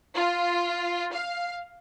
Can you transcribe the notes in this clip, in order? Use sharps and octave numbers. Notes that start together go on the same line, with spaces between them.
F4
F5